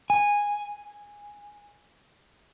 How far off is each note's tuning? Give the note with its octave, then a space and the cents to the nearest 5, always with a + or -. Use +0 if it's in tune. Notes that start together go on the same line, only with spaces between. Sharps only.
G#5 -10